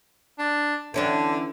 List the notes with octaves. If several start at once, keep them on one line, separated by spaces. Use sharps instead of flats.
D4
D3 E3 C#4 D4